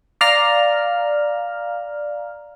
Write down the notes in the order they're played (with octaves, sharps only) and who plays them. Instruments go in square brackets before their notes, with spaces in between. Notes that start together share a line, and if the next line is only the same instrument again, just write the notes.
[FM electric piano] D5 F5 A#5 F6